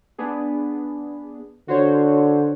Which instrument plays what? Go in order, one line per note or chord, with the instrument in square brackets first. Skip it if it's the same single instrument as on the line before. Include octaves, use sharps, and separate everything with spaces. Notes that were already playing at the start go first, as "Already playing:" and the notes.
[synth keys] B3 D4 G#4
[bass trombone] D3 [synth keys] F#4 C5 C#5